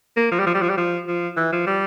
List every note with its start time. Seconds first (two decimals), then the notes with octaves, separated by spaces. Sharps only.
0.17 A#3
0.32 F3
0.39 G3
0.47 F3
0.54 G3
0.62 F3
0.70 G3
0.78 F3
1.07 F3
1.37 E3
1.52 F3
1.67 G3